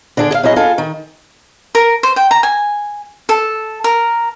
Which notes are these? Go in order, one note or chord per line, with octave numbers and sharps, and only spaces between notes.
D3 D4 G#4
G#4 F5
F#3 E4 G#4 D#5
F4 A4 G#5
D#3
A#4
C5
G5
A#5
G#5
A4
A#4